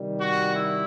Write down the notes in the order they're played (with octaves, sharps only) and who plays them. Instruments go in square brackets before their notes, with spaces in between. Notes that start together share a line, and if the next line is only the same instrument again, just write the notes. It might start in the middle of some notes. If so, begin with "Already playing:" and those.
Already playing: [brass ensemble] C3 D#3 G3
F#4
E4